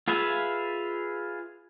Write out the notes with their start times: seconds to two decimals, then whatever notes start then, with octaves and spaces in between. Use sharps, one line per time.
0.08 F4 G#4 B4 E5 F5